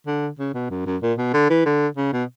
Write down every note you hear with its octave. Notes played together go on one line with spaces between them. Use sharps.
D3
C#3
B2
F#2
F#2
A#2
B2
D3
E3
D3
C#3
B2